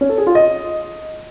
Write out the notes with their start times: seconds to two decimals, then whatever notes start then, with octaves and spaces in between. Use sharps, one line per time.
0.01 C#4
0.09 A4
0.18 G#4
0.27 F4
0.35 D#5